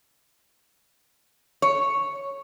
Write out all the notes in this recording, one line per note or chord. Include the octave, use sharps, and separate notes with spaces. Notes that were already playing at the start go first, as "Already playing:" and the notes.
C#5